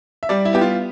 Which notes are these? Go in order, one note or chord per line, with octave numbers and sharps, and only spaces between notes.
E5
G3 D5
E4
B3 G4
F4